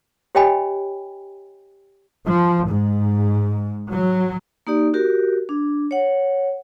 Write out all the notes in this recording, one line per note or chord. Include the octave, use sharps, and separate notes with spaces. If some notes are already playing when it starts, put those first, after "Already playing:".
G4 C#5 D#5 G5 G#5 B5
F3
G#2
F#3
A#3 D#4 G4 D5
F#4 G4 A#4
D4
C#5 F#5